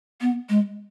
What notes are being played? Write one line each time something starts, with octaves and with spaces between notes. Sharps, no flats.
B3
G#3